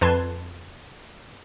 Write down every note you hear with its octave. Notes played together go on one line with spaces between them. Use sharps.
F2 B4 A5 C6 G#6